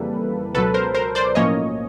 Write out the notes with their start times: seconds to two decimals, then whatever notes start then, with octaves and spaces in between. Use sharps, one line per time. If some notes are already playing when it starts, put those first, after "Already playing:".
Already playing: F2 C#3 E3 G3 A#3 A4 B4
0.54 C#2 B2 F#3 A4 B4
0.74 A#4 C5
0.95 A#4 C5
1.15 C5 D5
1.35 B1 A2 F3 A#3 C#4 C#5 D#5